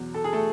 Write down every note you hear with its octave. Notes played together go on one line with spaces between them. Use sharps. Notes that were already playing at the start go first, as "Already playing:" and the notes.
Already playing: E2 B2 F#3
A4
G#4
A3 A4